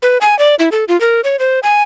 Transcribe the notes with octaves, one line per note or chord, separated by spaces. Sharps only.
B4
G#5
D5
E4
A4
F4
A#4
C#5
C5
G#5